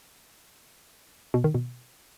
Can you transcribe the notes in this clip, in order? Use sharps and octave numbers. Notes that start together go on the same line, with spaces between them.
B2
D#3
B2